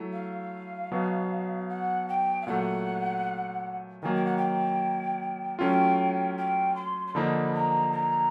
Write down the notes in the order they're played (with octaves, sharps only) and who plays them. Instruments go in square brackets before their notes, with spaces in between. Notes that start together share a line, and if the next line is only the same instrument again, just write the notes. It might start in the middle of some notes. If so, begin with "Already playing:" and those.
Already playing: [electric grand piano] F#3 A3 E4
[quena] F5
[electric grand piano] B2 F#3 B3
[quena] F#5
G5
F5
[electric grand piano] A#2 F#3 A3 [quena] F#5
[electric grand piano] D#3 F#3 A#3 [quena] G#5
[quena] G5
F#5
G5
[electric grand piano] F#3 A3 C#4 F4 [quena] G5
[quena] G5
C6
C6
[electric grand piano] D3 F3 A#3 D#4 [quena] B5
[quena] A#5
A#5